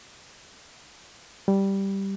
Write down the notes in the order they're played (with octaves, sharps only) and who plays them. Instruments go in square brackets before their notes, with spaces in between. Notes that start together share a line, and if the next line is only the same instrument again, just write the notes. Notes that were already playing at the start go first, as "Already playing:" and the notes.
[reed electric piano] G3